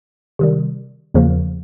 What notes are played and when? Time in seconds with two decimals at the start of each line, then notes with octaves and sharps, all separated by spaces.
0.39 C3 D#3 G3
1.14 E2 C#3 F3 A#3